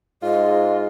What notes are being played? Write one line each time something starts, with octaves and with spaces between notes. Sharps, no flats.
G#2 F4 D#5